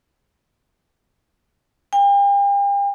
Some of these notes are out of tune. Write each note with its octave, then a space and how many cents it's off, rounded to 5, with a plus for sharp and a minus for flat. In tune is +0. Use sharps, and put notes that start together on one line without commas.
G5 +40